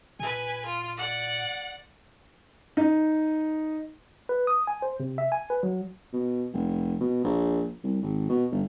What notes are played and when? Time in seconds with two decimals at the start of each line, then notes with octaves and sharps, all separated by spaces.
0.19 A#2 B4 G#5
0.66 F4
0.97 D5 F#5
2.77 D#4
4.29 B4
4.47 D#6
4.67 G#5
4.82 C5
5.00 C3
5.18 E5
5.32 G#5
5.50 B4
5.63 F#3
6.13 B2
6.53 F1
7.00 B2
7.24 A#1
7.84 C2
8.03 G#1
8.29 B2
8.51 G1